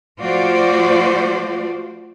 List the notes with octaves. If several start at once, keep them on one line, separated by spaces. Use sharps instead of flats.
F3 A3 F4 F#4 C5 D5